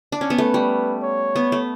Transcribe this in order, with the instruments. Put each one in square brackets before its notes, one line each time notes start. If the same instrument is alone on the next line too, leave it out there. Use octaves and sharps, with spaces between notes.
[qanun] D4
C#4
B3
[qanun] A3 [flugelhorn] B4
[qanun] G3
[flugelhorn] C#5
[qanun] B3
A3